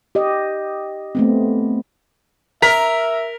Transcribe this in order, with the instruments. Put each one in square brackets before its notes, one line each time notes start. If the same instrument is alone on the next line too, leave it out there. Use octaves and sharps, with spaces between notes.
[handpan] G4 D#5
A3 B3 C4
[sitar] A#4 [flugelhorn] E5 [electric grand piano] A#5 [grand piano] B6